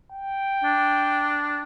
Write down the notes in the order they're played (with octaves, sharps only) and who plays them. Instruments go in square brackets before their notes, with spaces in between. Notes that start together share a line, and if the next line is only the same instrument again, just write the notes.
[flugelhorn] G5
[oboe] D4